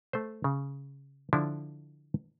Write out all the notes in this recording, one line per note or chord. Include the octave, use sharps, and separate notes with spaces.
A3 C5
C#3
D3 F3 D4 E4